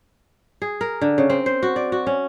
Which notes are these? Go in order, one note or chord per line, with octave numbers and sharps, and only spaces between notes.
G#4
A#4
D3
C#3
C4
C5
F#4
D5
F#4
C#4